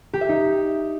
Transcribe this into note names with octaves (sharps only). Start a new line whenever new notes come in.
G4
E5
D#4